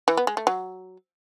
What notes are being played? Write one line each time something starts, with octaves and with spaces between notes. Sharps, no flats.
E3
B3
G#3
A3
F#3